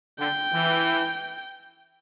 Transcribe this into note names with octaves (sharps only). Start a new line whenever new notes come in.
D3 G5
E3